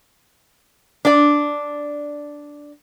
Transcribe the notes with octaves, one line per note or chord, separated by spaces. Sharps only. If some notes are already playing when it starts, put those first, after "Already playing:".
D4 D5